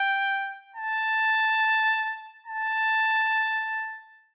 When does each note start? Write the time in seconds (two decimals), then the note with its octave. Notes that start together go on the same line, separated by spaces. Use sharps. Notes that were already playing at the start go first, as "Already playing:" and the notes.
Already playing: G5
0.76 A5
2.46 A5